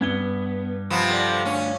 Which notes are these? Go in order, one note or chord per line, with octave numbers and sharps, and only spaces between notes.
G2 B3 G#6 G7
C3 F3 B3
A4 D5
A3 C#4 D4